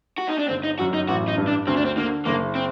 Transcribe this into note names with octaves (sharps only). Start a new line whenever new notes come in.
F#4
D#4
D4
G1 C4
D#4
F#2 F#4
D#4
A1 F#4
D#4
G2
D4
D2 C4
D4
C4
D3 A#3
F#1 A#3
C4